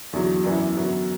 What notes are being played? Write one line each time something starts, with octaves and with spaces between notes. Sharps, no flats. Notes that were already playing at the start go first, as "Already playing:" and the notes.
E2 D3 F#3
F#2 E3 B3 D4
F#2 D3 F#3 B3